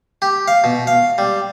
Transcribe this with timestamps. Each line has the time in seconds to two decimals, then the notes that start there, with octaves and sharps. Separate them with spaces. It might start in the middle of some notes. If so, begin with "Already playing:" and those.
0.22 G4
0.48 F5
0.64 B2
0.87 F5
1.18 G3